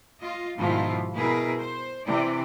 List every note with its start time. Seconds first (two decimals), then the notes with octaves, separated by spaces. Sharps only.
0.20 F4 D#5
0.57 G#2 B2 D#3 F3 E4 F4
1.14 B2 E4 G#4 A#4 B4
1.60 C5
2.07 C3 E3 D5